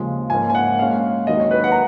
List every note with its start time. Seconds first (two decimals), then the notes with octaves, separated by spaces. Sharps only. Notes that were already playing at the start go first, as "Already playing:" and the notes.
Already playing: D#2 C#3 F3 G#3
0.30 G#2 F3 A#3 C#4 G#5
0.50 G#5
0.55 F#5
0.79 A#2 G#3 C#4 F5
1.27 D#2 D#3 F#3 D#5
1.40 C#5
1.51 B4
1.64 F#5
1.72 A#5